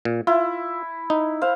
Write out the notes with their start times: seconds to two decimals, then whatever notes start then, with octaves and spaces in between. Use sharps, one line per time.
0.05 A#2
0.27 E4 F4
1.10 D#4
1.42 C5 F5